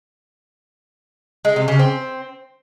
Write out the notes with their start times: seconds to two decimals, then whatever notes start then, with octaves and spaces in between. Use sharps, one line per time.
1.45 G#3
1.56 C3
1.68 C#3
1.79 C4